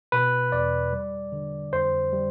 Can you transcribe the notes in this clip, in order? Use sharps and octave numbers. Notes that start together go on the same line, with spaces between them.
B2 B4
E2 D5
G3
D3
F2 C5
G3